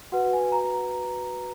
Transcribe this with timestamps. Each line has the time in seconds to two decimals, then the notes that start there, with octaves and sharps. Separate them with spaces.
0.12 F#4 B4 F#5
0.33 G#5
0.52 A#5